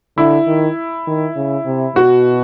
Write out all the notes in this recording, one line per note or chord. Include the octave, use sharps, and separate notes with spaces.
D3 E4
D#3
D#3
C#3
C3
B2 F#4